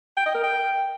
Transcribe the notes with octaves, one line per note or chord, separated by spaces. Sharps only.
G5
D#5
A#4
G5